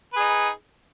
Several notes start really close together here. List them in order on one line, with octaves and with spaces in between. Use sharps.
B4 G#4 D#4